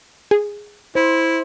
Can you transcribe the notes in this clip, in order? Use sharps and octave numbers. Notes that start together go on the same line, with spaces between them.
G#4
E4 C5